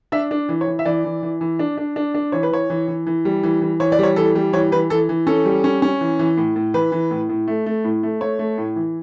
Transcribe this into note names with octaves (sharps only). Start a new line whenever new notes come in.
D4 E5
D4
E3
C#5
E3
E5
E3 D5
E3
E3
E3
D4
D4
D4
D4
E3 C#5
B4
E3 C#5
E3
E3
E3
G3
E3
E3
E3 C#5
D5
G3 C#5
E3 A4
G3
E3 C#5
E3 B4
E3 A4
E3
C#4 A4
G3
C#4
C#4
E3
E3
A2
A2
E3 B4
E3
A2
A2
A3
A3
A2
A3
A3 C#5
A3
A2
E3